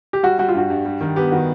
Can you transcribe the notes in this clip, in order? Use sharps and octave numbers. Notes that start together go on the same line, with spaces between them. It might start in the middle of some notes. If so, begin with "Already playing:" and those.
G4
G3 F#4
G3 F#4
F4
G2 F#4
G2
G3
D#3
B3 G4
D#3 F#4